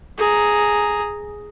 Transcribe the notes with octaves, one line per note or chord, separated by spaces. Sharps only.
G#4 A#5